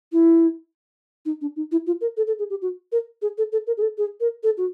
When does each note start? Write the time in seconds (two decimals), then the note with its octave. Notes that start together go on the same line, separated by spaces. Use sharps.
0.12 E4
1.25 D#4
1.41 D4
1.56 D#4
1.71 E4
1.87 F4
2.01 A#4
2.17 A4
2.27 A4
2.39 G#4
2.50 G4
2.62 F#4
2.92 A#4
3.22 G#4
3.38 A4
3.52 A4
3.67 A#4
3.77 G#4
3.82 A4
3.98 G#4
4.20 A#4
4.43 A4
4.57 F#4